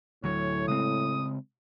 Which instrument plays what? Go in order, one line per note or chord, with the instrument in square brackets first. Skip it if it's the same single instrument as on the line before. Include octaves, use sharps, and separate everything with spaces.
[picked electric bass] D2 F#3 [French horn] A2 [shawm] C#5
[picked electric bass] C#3 G#3 C4 [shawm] D#6